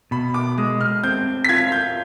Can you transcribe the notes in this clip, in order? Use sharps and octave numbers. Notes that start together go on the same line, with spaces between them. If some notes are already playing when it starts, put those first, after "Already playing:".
B2 B5
D6
G#3 D#6
F6
C4 G6
B6
F4 G#6
G6